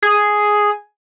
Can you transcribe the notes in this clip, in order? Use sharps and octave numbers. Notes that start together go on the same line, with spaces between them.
G#4